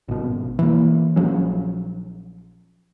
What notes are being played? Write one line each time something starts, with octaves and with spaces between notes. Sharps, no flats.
G#1 B2
E3 A#3
A#1 F3 F#3 C#4